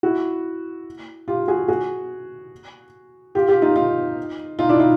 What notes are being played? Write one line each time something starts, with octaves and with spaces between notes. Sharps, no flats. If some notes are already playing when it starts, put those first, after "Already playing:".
E4 F#4
F4 G4
F#4 G#4
F#4 G#4
F4 G4
F4 G4
D#4 F4
D#4 F4
D#4 F4
D4 E4
D#4 F4